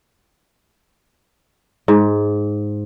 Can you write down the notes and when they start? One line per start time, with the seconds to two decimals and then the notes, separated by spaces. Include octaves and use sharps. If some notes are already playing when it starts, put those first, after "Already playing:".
1.88 G#2